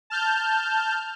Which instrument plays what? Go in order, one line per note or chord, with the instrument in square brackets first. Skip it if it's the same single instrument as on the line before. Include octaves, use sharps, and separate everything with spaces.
[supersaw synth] A5 F6 G6